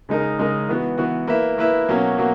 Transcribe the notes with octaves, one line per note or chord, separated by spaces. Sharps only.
C#3 G#3 D#4 A#4
C#3 G#3 D#4 A#4
E3 B3 F#4
E3 B3 F#4
A#3 E4 B4 E5
A#3 E4 B4 E5
B2 F#3 A#3 C#4
B2 F#3 A#3